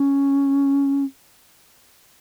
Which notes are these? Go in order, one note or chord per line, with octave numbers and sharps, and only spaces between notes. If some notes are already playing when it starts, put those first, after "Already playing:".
Already playing: C#4